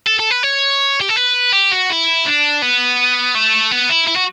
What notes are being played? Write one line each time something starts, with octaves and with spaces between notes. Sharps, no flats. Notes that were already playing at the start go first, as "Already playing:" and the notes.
A4
A4
B4
C#5
G4
A4
B4
G4
F#4
E4
D4
B3
A3
B3
E4
E4
F#4